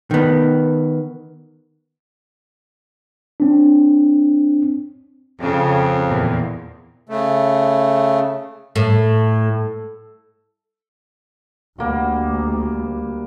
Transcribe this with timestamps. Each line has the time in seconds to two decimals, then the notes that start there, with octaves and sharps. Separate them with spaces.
0.11 D#3 B3
3.40 C4 D4
5.41 F2 C#3
6.07 E2 A#2
7.09 C#3 A3
8.76 A2
11.78 D2 G3 A#3 F#4